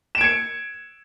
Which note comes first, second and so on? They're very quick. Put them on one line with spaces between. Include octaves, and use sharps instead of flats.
E7 D7 G#6 C#7